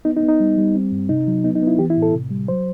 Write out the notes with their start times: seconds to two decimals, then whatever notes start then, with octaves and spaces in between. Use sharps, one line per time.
0.05 B3 D#4
0.17 D#4
0.23 B3
0.29 D#4
0.40 G3
0.58 G3
0.75 C4
0.92 G2
1.09 C3 D#4
1.27 F#3
1.44 B3 D#4
1.56 D#4
1.62 B3
1.67 E4
1.78 E3 G4
1.90 E4
1.97 A2
2.02 A4
2.14 C3
2.31 G3
2.48 F#3 C5